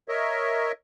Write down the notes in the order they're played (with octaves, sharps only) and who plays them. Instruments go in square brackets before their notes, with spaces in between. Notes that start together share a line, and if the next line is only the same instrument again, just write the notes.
[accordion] A#4 C#5 D#5 E5